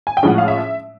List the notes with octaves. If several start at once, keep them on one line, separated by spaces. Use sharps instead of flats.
G#5
G5
A2 F3 G#3 C#4 F#5
F5
E5